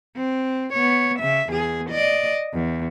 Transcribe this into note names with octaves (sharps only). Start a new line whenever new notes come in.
C4
B3 C#5
C#3 E5
E2 G#4
D5 D#5
E2